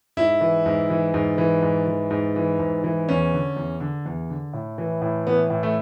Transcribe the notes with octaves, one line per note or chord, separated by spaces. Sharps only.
G#2 E4
E3
G#2
E3
G#2
E3
G#2
E3
G#2
E3
G#2
E3
E2 C#4
D3
E2
D3
E2
D3
A2
E3
A2
E3 B3
A2
A3